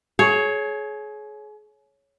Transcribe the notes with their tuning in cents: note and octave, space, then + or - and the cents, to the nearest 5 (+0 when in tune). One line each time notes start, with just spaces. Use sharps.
G#4 +35 C#5 +0